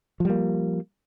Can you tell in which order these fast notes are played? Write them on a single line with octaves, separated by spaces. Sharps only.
F3 G3 A#3